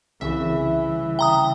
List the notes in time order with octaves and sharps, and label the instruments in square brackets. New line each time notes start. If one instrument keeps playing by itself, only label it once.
[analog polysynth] C2 C#3 E5 [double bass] E3
[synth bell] G5 A#5 D#6